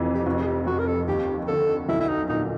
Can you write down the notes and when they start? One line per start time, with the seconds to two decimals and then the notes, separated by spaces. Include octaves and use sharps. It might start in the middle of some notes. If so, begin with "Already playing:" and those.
Already playing: F1 F2 E3
0.15 G4
0.26 F1 F#4
0.41 G#4
0.47 G4
0.66 F2 F#4
0.79 A#4
0.87 A4
1.08 D#2 G4
1.48 D3 A4
1.89 B1 E4
2.00 E4
2.09 D#4
2.29 A#2 D#4